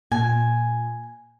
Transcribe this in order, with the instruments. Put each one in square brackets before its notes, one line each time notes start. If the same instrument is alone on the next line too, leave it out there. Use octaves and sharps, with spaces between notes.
[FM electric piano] A#2 [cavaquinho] G#5